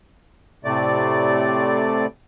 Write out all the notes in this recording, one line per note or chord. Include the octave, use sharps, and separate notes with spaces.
A2 C3 A3 D5